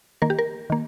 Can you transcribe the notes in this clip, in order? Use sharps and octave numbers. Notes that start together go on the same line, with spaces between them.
D#3 A#3 A#4
G4
A#4
D#3 A#3